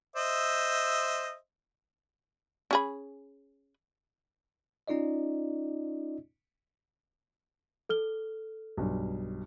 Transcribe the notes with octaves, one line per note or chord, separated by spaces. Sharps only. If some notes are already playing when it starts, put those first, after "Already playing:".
C5 D#5 E5
C#4 G#4 B5
C#4 D#4 F4 D5 D#5
A4 F6 G7
B1 G2